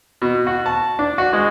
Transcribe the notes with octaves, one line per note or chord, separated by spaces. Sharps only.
B2
F#4
A5
D4
F#4
G#3